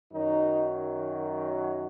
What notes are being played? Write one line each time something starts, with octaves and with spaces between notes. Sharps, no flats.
F#2 D#3 F#3 D#4